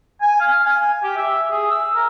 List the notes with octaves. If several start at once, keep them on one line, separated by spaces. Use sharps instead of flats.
G#5
F5
G#5
G4
E5
G#4
E6
A#4